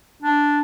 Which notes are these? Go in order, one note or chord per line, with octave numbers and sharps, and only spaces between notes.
D4